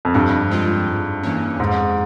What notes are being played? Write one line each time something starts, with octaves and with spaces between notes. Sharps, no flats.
F2
G2 F3
G#3 C4 F4
G#2
E3 A#3 C#4
F2 G#2